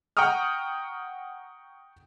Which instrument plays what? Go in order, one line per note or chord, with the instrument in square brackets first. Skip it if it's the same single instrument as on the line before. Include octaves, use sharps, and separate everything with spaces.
[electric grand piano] F#5 G5 A#5 C#6 D#6 F6